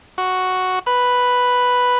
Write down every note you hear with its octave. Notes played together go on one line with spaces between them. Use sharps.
F#4
B4